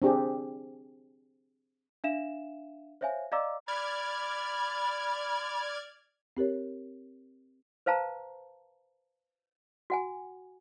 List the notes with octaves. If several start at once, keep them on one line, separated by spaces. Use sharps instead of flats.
C4 D4 G4 G#4
D4 E5 F5 E7
C5 C#5 E5 F5 G#5
D5 D#5 F5 A#5 D6 E6
D5 B5 F6 G#6
C4 G4 A#4 C#5
B4 C5 F5 A5 A#5
F#4 F#5 G#5